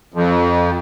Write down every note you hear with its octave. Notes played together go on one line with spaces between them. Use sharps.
F2